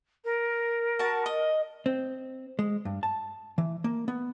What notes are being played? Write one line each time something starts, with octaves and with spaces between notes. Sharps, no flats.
A#4
F#4 A5
D#5
C4
G#3
G2
A5
E3
A#3
B3